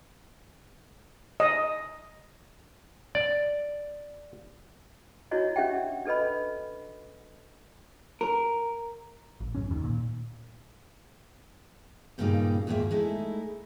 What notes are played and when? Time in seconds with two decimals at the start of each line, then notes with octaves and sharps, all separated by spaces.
1.40 D#5
3.15 D5
5.31 D4 E4 F#4 C#5 D#5
5.56 C#4 D4 G4 E5 F#5 G5
6.06 D4 A4 B4 D#5 B5
8.21 A#4
9.40 A1
9.55 A#1 F#2 C#4
9.69 D1 D#2 D#3
9.84 A#2
12.18 G2 A#2 C#3 G3 A#3 D#4
12.67 D#2 G#2 D#3 A#3 F4 E5
12.91 G#3 A3 D#4 E4